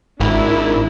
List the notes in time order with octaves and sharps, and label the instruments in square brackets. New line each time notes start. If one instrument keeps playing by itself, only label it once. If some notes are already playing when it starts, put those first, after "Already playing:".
[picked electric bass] G#1 [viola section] D4 E4 A#4